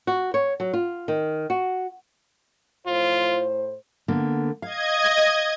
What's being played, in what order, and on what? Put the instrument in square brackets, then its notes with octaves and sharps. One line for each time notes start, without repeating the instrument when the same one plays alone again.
[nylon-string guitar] F#4
C#5
F#3
F4
D#3
F#4
[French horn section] A2 C5 [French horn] F4
[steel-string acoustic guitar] D3 A#3 B3
[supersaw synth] D#5 G#6 [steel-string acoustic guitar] F5